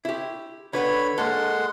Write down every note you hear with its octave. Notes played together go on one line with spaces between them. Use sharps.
E4 G4
D3 B4 C#5 F#5 B5
G#3 A#3 A4 F#5 C6